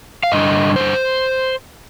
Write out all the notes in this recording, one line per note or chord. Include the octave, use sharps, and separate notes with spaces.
F5
G2 D3 G3 D4 D#5
C5